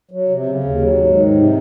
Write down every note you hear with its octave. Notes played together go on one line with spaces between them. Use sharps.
F#3
C3
C#3
D#2
F#3
G#2
D#3
C3